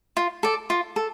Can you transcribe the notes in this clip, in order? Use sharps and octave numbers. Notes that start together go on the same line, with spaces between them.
F4
A4 D5
F4
A4